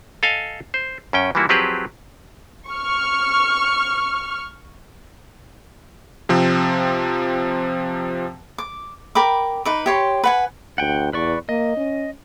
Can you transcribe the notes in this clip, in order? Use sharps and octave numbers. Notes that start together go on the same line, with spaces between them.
A4 D#5 F5 G#5
C5
F#2 C#4 G5
E3 F3 G3 A#3 E4 F#4
F3 F#3 C4 G4 G#4 B4
C#6 F6
C3 F3 C4
D6
A#4 G5 B5 D6
D#4 B4 D6
G4 C#5 C6
B4 F#5 G#5
D2 F#5 G5
E2 B4 D5 C#6
A#3 D#5
C#4